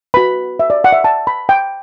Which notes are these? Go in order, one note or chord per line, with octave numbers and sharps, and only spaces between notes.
F#4 B4 B5
E5
D5
F#5
E5
A5
B5
G5